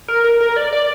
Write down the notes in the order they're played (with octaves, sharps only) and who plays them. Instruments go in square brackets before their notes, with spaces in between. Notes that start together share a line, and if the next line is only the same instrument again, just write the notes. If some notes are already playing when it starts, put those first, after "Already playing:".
[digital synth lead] A#4
A#4
A#4
D5
D5